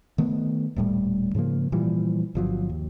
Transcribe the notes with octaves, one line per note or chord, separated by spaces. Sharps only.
D#3 A3 B3
D#1 A2 G3
G#2 C#3 F3 A#3
A#2 E3 F3 G3
G1 F3 F#3
D#2